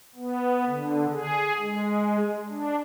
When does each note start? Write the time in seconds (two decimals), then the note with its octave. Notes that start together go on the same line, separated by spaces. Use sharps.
0.16 B3
0.67 D3
1.13 G#4
1.60 G#3
2.49 D4